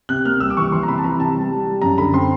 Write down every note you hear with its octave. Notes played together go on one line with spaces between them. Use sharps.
C3 F#6
A#3 F6
G3 E6
D6
E3 C#6
E3 C6
A#5
C3 B5
A5
E3 A#5
C3 A5
G3
G3
G3
F#2 A#5
D3 B5
C4 C6